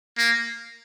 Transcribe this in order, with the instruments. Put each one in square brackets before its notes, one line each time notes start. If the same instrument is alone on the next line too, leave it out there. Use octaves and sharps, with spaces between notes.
[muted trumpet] A#3